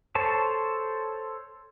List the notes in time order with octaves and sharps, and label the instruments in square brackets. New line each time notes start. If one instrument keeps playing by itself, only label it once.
[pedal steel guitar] A4 C5 C#5 A5